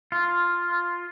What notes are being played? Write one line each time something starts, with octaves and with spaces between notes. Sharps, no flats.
F4